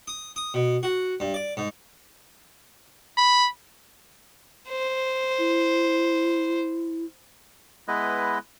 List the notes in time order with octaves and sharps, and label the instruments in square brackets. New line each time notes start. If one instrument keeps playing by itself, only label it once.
[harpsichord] D#6
D#6
B2
F#4
G2
D5
G#2
[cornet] B5
[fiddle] C5
[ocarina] E4
[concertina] G#3 B3 E4 B4 D#5